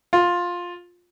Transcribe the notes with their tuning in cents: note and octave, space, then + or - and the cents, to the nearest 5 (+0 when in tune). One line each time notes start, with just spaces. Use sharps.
F4 +10